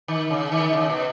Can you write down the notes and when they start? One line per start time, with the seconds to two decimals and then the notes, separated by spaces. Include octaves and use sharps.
0.08 D#3
0.30 C#3
0.52 D#3
0.73 C#3
0.90 B2